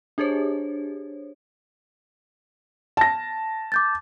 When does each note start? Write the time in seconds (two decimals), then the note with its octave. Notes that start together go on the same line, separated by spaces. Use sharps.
0.18 D4 G4 G#4 C5 C#5
2.97 A5 A#6
3.72 D6 G6 A6